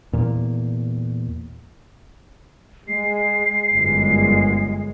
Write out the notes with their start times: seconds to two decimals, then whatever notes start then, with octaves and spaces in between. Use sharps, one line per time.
0.13 E2 A#2
2.88 G#3 C7
3.71 G1 F#2 G#3